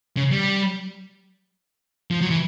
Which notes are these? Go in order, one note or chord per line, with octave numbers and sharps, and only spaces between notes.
C#3
G3
F3
F#3
E3